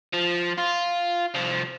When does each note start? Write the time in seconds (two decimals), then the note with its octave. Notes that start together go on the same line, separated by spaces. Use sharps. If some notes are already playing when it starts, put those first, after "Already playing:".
0.14 F3
0.58 F4
1.35 C2 F3